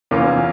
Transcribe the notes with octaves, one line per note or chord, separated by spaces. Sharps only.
E2 E3 A#3 C#4 F4